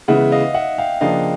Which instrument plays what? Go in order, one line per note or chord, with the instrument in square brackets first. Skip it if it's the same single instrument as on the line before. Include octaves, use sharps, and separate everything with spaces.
[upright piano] C#3 E3 G#3 B3 [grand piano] E5 F#5
[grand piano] D#5 F5
E5 F#5
F5 G5
[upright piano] C#3 F3 A#3 D4 [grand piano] D#5 F5